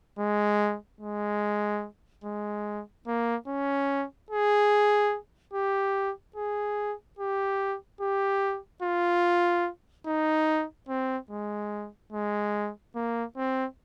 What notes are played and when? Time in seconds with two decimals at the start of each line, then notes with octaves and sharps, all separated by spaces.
0.19 G#3
1.01 G#3
2.24 G#3
3.07 A#3
3.47 C#4
4.30 G#4
5.54 G4
6.36 G#4
7.19 G4
8.01 G4
8.83 F4
10.07 D#4
10.89 C4
11.31 G#3
12.13 G#3
12.95 A#3
13.37 C4